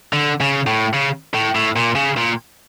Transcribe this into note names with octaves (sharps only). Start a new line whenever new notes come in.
D3
C#3
A2
C#3
A2
A2
A#2
C#3
A#2